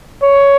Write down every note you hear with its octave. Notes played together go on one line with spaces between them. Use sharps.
C#5